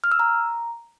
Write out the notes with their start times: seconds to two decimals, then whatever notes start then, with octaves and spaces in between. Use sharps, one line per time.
0.04 F6
0.12 E6
0.19 A#5